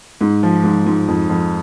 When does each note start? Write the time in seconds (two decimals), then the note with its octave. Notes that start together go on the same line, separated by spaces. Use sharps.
0.21 G#2
0.43 F3
0.64 G#2
0.86 G#2
1.08 F2
1.29 F2